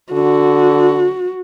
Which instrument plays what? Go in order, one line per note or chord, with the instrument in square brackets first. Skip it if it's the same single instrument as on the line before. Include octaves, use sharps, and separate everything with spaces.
[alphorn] D3 [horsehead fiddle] F#4